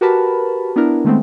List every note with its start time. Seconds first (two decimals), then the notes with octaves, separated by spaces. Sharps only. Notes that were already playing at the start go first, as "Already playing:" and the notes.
0.01 F#4 G4 A#4 B4 A5 B5
0.76 B3 D4 E4 A#4
1.04 D#3 G#3 A3 B3 C4